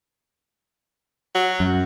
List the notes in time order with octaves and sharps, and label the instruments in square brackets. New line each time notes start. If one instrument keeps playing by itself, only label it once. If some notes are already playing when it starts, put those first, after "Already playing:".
[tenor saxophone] F#3
[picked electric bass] F#2